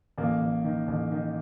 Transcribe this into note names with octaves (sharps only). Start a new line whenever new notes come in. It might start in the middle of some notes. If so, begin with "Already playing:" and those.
A1 A#3
A1
D#3
A1
D#3